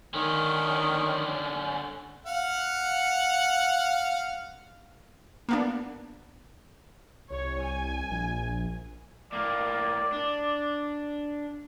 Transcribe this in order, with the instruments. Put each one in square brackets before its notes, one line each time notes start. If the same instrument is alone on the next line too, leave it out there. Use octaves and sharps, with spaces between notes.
[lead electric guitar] D3 C#4 [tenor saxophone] D#3
[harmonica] F5 F#5
[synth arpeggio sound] A#3 B3 D4
[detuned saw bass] C2 [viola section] C#5
[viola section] G#5
[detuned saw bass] A#1
[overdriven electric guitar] A2 A#3 [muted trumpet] D5
[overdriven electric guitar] D4